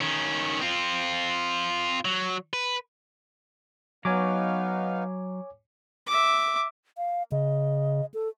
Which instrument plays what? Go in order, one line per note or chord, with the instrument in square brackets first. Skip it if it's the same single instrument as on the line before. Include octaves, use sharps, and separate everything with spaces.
[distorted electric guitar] D#3 C#4
C4 F4
F#3
B4
[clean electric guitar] F#3 [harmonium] B3 D#4 F5 [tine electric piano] C#5 G#5 D6
[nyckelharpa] E5 D6
[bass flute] F5
[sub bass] C#3 [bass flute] D#5
[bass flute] A4